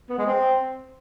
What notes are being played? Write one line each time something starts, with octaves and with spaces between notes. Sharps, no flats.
B3
G#3
C4